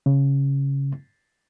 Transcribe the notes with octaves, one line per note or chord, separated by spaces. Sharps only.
C#3